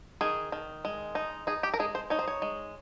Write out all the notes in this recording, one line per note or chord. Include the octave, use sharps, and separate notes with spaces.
D#3 G#4
D#3
G#3
D#4
D#4 G#4
G4
A#4
G#3 G#4
C5
D#4 C#5
C5
C#5
G#3